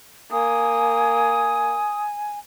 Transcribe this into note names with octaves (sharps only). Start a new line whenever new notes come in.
A#3 G#5 D#6